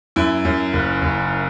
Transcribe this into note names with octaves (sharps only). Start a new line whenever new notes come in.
F#2 E4
F#2
F#1
F#1